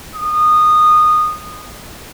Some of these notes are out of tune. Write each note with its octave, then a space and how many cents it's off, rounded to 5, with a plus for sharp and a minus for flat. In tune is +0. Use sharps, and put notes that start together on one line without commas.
D#6 -20